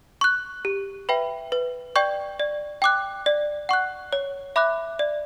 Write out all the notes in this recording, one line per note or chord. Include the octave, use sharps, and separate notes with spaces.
C#6 F#6
G4
B4 E5 G5 B5
B4
D5 G5 C#6 G6
D5
G5 D6 F#6
D5
F#5 C#6 F#6
C#5
E5 B5 D6 F#6
D5